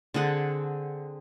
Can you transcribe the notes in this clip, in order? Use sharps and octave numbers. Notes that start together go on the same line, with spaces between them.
D3 C4 G#4 F#5